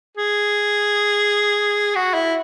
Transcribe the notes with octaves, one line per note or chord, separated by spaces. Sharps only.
G#4
F#4
E4